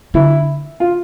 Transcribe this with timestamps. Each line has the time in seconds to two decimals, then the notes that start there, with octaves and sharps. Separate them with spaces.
0.14 D3 E4
0.80 F4